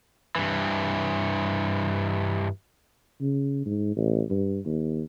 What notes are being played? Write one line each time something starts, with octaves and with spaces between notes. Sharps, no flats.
G2 E3
C#3
G#2
A1
G2
D#2